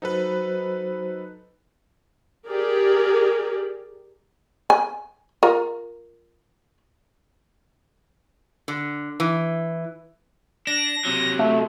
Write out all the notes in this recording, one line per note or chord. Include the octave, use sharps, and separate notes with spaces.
F#3 D#4 F#4 A4 B4 C5
G4 G#4 A#4 D5
G#5
F4 A#4
D3
E3
D4 A#6
C3 F#3
A3